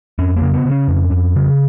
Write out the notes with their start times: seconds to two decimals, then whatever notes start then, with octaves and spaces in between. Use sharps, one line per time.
0.19 F2 C#4
0.36 A#3
0.42 C#3
0.54 B3
0.65 C#3
0.71 C#4
0.88 F2
1.11 F2
1.35 C#3